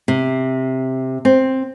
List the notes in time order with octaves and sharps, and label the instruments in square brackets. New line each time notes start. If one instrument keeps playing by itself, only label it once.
[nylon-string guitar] C3
C4